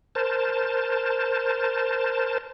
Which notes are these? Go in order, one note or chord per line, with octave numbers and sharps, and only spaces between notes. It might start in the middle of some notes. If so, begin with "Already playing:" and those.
A#4 C5 A5